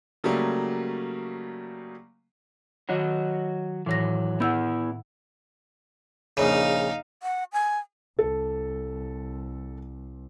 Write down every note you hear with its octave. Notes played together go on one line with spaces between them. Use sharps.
C#3 F#3 G3 A3 A#3
D#3 F#3 F#4 D#5
A2 E3 F#3 A#6
B3 E4 F#5 E6 G6
A#1 C#3 D#4 F5
F#5
G#5
C2 A4